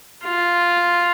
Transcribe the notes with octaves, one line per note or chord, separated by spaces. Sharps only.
F4